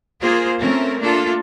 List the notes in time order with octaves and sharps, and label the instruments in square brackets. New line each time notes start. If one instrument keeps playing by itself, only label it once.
[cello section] A#3 F4 G#4 C5
A3 C4 C#4 A#4
A3 A#3 D4 F4 A4